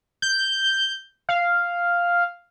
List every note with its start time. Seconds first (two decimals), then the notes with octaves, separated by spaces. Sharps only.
0.22 G6
1.29 F5